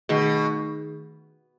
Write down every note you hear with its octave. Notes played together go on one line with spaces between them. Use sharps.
B2 D#3 A3 D#4 G#4